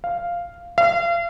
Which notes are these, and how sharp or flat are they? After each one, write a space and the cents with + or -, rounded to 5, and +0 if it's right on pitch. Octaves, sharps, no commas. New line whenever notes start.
F5 -5
F5 -35